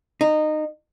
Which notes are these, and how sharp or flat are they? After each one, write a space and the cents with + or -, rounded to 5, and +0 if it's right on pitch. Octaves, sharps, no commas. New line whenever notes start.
D#4 -20